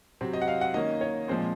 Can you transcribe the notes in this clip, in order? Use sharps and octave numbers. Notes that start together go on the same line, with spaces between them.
C3 F#3 C4
D#5
F#5
F5
F#5
D#3 A#3 C#4 D#5
C#5
A#2 F3 G#3 C4 C5